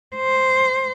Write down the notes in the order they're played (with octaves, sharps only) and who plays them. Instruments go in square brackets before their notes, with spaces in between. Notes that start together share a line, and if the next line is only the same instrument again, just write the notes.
[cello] C5